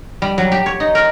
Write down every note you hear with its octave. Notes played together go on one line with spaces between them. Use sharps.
G3
F#3
G4
C#5
D#4
A#4